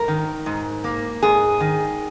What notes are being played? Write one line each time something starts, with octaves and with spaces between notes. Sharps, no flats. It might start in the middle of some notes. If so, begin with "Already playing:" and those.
Already playing: G#2 A#4
D#3
G#2
A#3
G#2 G#4
D#3